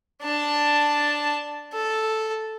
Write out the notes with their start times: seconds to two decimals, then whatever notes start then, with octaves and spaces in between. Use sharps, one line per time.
0.23 D4 A5
1.73 A4